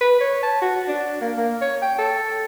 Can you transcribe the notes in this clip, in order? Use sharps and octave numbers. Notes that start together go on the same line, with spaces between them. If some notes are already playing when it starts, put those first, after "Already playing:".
B4
C#5
A5
F#4
D4
A#3
A#3
C#5
G5
A4